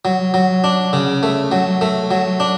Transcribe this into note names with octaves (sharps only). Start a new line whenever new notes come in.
F#3
F#3
D4
C#3
A3
F#3
A3
F#3
D4